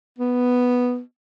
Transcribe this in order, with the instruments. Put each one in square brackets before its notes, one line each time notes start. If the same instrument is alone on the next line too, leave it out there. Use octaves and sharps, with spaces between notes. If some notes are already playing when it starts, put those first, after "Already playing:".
[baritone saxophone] B3